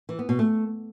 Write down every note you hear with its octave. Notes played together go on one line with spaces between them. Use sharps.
E3
B3
B2
A3